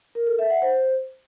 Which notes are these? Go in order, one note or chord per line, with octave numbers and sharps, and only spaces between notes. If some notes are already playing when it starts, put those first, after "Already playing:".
A#4
A4
E5
F#5
C5